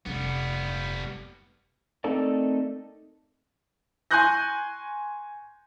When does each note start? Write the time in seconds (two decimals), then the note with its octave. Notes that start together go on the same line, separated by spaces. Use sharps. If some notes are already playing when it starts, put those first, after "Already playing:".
0.06 F1 G3 B3 D#4
2.04 A3 C4 D#4 A4 A#4 D5
4.11 G#5 C6 C#6 F#6 G6 A#6